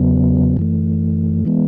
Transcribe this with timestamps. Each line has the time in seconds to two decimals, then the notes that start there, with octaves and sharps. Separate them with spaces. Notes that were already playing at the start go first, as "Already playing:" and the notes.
Already playing: E2 C#3 F#3 B3
0.57 F#2 E3 A3
1.45 E3 G#3 B3